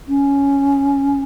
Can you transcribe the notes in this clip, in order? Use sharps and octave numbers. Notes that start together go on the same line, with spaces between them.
C#4